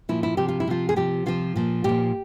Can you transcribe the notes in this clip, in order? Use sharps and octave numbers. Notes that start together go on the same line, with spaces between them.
A#2 F3 E4
E4
C3 F3 G4
F4
E4
C3 F3 F4
G#4
C3 F3 G4
C3 F3 F4
A#2 F3
A#2 F3 G4